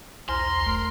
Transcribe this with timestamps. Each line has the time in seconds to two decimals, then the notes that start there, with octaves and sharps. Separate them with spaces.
0.29 B1 E2 C5 A#5 C6 F6
0.66 E1 A3 A#4